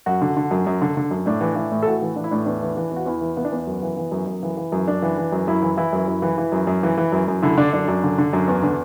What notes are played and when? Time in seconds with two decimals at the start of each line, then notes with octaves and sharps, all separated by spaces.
0.06 F#2 F#4
0.21 D3
0.37 D3
0.51 F#2
0.67 F#2
0.82 D3
0.97 D3
1.11 F#2
1.26 A2 D4
1.41 E3
1.56 E3
1.71 A2
1.83 A4
1.86 A2 F#4
2.02 E3
2.16 E3 D4
2.24 E4
2.31 A2 D4
2.46 E2 D4
2.62 E3
2.77 E3
2.92 E2 F#4
3.06 E2 E4
3.21 E3
3.37 E3 B3
3.45 D4
3.52 E2 B3
3.67 F#2
3.82 E3
3.97 E3
4.12 F#2
4.27 F#2
4.43 E3
4.57 E3
4.72 F#2
4.88 F#2 D4
5.02 E3
5.18 E3
5.32 F#2
5.47 F#2 E4
5.62 E3
5.77 E3 E4
5.93 F#2
6.08 F#2
6.22 E3
6.38 E3
6.52 F#2
6.67 F#2
6.83 E3
6.97 E3
7.12 F#2
7.28 F#2
7.43 D3 E4
7.57 D3 D4
7.73 F#2 D4
7.88 F#2
8.04 D3
8.18 D3
8.33 F#2
8.48 E2
8.63 D3